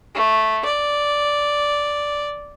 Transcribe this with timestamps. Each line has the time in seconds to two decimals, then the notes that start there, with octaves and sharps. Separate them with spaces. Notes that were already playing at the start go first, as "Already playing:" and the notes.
0.15 A3
0.65 D5